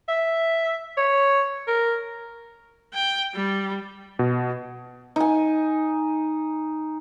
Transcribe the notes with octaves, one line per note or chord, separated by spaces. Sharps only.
E5
C#5
A#4
G5
G3
B2
D#4 G#5